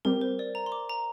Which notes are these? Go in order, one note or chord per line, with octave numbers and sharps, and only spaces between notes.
G3 C4 G4 A#4
C5
D5
A#5
C6
D6
A#5